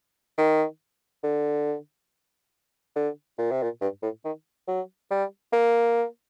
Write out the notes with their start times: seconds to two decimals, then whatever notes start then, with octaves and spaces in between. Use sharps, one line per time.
0.38 D#3
1.23 D3
2.96 D3
3.38 A#2
3.51 C3
3.63 A#2
3.81 G2
4.02 A2
4.25 D#3
4.68 F#3
5.11 G3
5.53 A#3